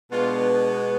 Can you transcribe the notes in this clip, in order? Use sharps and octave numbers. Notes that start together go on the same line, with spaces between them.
B2 G#3 B3 D4 F4